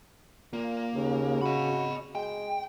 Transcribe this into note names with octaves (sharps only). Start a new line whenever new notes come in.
A#2 A#3
D#2 C#3
F#4 D#5 B5
G#3 G5